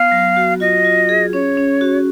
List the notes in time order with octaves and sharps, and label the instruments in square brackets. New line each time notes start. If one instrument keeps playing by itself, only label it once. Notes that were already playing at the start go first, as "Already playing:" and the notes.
Already playing: [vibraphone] B3 [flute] F5
[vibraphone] F#3
F#4
[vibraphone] F4 [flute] D#5
[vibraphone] F4
G#4
[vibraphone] C#4 [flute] C#5
[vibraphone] C#4
F#4